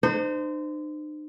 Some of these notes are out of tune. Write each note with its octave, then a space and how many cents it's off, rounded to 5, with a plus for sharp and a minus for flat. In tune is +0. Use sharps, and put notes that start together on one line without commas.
D#4 -45 C5 -25